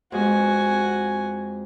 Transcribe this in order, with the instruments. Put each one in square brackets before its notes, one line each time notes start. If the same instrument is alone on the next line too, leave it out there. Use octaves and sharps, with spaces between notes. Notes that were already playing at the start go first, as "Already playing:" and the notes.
[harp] F2 G#3 B3 [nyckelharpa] F#4 G#5